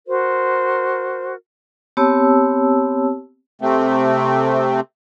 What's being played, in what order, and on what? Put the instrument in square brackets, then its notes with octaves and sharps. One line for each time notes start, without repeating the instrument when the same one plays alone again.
[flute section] F#4 A#4 C5
[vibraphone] B3 C4 G4 C#5 A5 E6
[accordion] C3 A3 C4